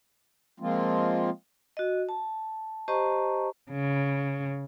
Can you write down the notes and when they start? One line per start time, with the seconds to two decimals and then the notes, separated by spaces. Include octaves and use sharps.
0.60 F3 G#3 A#3 C4 F4
1.77 F#4 D#5
2.09 A5
2.88 G4 C5 D#5 A5 A#5 C#6
3.69 C#3